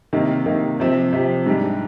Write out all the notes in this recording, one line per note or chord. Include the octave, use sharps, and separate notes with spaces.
C3 D#3 A#3
C3 D#3 A#3
C3 F3 C4 G4
C3 F3 C4 G4
G#2 G3 D4 G4